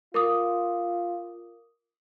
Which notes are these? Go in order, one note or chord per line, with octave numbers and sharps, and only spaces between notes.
F4 A#4 D6 D#6